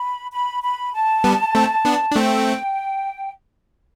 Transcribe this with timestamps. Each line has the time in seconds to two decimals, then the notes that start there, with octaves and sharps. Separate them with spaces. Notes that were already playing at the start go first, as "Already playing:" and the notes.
Already playing: B5
0.31 B5
0.63 B5
0.93 A5
1.24 G3 B3
1.55 A3 C4
1.85 B3 D4
2.11 D4
2.15 A3 C4 G5